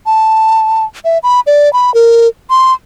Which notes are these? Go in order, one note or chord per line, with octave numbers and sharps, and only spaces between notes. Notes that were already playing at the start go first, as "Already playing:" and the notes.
A5
E5
B5
D5
B5
A#4
C6